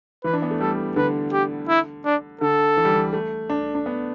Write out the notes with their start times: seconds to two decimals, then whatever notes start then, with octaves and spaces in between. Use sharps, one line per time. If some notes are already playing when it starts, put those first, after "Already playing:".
0.24 E3 B4
0.33 D4
0.42 B3
0.51 A3
0.60 G3 A4
0.96 D3 B4
1.33 G4
1.69 E4
2.05 D4
2.41 D3 A4
2.77 E3
2.85 G3
2.93 E3
3.13 A3
3.50 D4
3.75 D4
3.86 B3